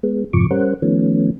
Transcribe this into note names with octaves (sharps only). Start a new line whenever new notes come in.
G#3 B3
F2 G#2 C3 F3 C#6 D6
G3 C#4 A#4 C5 F#5
D#3 F3 A3 B3 C#4